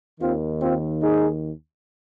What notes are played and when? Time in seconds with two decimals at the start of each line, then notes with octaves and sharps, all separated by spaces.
0.20 D#2 D#3 C4 F4
0.60 C4 F4
1.03 D#4 G#4